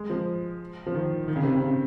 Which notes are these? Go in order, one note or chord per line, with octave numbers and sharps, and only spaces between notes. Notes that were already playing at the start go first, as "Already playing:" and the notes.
Already playing: G#3
F3
F3
D#3
D#3
C#3
C3
C#3
C#3